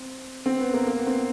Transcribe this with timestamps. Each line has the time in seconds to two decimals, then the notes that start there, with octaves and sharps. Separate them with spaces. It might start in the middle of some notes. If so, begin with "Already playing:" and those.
Already playing: C4
0.46 C4
0.60 B3
0.73 A#3
0.87 A#3
0.97 B3
1.07 C4